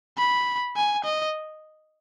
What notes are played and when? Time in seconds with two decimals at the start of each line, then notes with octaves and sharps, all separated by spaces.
0.18 B5
0.76 G#5
1.04 D#5